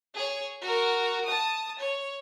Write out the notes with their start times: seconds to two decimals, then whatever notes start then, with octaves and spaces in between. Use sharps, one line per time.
0.14 G#4 C#5
0.61 F#4 A#4
1.25 A5 D#6
1.79 C#5